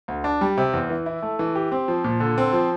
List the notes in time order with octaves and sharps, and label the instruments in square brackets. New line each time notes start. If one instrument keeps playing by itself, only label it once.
[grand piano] D2
D4
G3
C3
E2
E3
E4
A3
E3
G4
C4
F3
A#2
D3
C4
F3